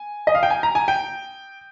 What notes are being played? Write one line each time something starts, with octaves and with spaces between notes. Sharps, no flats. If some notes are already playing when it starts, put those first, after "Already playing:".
Already playing: G#5
D#5
F5
G5
G#5
A#5
G#5
G5